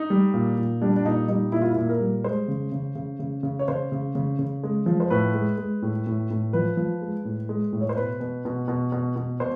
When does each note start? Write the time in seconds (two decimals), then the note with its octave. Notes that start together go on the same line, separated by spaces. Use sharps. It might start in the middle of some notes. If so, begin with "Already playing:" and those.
Already playing: D#4
0.10 G3
0.34 A#2
0.57 A#2
0.82 G3 D4
0.96 D4
1.05 A#2 D#4
1.28 G3 D#4
1.52 A#2 E4
1.62 F4
1.70 E4
1.77 A#2
1.89 A#4
2.00 G3
2.24 G#3 C5
2.48 C#3
2.72 C#3
2.95 C#3
3.19 C#3
3.43 C#3
3.59 C#5
3.68 C#3 C5
3.92 C#3
4.15 C#3
4.39 C#3
4.64 G#3
4.86 F3
5.00 C5
5.10 A2 B4
5.35 G#3
5.58 G#3
5.82 A2
6.07 A2
6.30 A2
6.53 F3 B4
6.77 F3
7.02 G#3
7.25 A2
7.49 G#3
7.73 A2
7.81 C#5
7.89 C5
7.97 B2 B4
8.20 B2
8.45 B2
8.68 B2
8.92 B2
9.16 B2
9.40 B2 C5